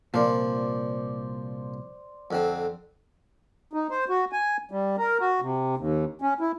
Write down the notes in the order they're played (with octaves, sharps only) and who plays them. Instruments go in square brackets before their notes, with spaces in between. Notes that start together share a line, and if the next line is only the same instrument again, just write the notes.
[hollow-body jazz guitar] C2 A#2 [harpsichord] F3 A#3 [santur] C5 D5
[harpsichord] F2 D3 C4
[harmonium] D#4
C5
F#4
G#5
G3
A#4
F#4
C3
D#2
C#4
E4